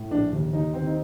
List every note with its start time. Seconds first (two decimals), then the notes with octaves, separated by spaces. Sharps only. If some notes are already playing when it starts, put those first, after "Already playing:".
Already playing: A2
0.11 A#1 D4
0.32 D#2
0.53 D#2 D#4
0.74 D#3 C4
0.86 D#4